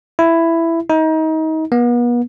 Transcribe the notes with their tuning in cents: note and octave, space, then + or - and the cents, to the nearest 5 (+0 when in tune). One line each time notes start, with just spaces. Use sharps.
E4 +10
D#4 +30
B3 -40